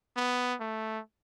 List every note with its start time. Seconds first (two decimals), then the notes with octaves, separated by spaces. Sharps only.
0.16 B3
0.60 A3